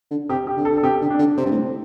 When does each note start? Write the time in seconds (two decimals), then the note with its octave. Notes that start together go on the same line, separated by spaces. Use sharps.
0.11 D3
0.29 C3 G4
0.47 G4
0.56 D3
0.65 A4
0.72 D3
0.77 A4
0.83 C3 G4
1.01 D3
1.10 D4
1.19 D3
1.37 C3 C4
1.46 G2
1.51 A2